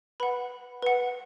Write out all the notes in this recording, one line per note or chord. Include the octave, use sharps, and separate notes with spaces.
B4 F#5 B5
B4 F#5